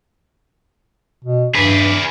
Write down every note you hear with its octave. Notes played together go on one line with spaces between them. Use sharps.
B2
G2 G#4 B4